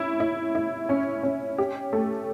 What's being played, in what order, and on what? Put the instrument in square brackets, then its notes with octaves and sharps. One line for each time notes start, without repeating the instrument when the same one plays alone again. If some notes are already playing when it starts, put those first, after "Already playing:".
Already playing: [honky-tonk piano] C#4 E4
E4
E4
C#4
C#4
G4
A3